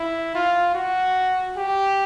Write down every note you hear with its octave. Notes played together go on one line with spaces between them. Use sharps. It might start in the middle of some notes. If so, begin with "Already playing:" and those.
Already playing: E4
F4
F#4
G4